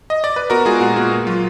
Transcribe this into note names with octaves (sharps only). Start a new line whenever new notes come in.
D#5
D5
B4
B3 F#4 A#4
G#3 F4 G#4
A#2 F#4
A#2 F4
A#3
F#3 F4